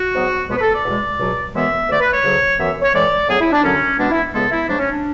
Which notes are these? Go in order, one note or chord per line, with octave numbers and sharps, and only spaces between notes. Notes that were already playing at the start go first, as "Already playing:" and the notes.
Already playing: F#4
G#2 F#3 B3
C#2 B2 G#3 B3
B4
A4
D5
E2 B2 G#3
C#2 B2 F#3
F#2 E3 G#3 B3 E5
D2 D3 A3 D5
B4
C#5
D2 C#3 F#3
F#2 E3 B3 E5
C#5
A2 E3 G#3 D5
A2 F#3 B3 G#4
E4
D4
F#2 D3 F#3 C#4
B2 G#3 B3 D4
E4
C#2 C#3 G#3 B3 A4
E4
G#2 F#3 A3 D4
C#4
D4